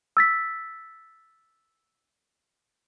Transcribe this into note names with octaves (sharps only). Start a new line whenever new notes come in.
E6 A6 B6